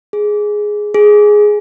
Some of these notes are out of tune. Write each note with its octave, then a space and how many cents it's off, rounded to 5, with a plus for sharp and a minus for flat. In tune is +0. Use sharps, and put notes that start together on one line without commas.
G#4 +5
G#4 +5